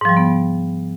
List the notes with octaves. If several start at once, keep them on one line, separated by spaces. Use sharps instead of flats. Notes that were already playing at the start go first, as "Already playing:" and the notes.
G#2 C#3 F3 G3 B3